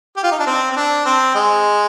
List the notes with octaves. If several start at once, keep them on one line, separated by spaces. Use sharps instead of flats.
G4
F4
D#4
D4
C4
C4
D4
C4
G#3